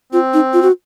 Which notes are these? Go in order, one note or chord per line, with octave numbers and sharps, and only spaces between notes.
C4 F4
D#4
F4
F#4